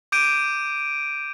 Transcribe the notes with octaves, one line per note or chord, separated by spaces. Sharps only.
D6 G6 D7 D#7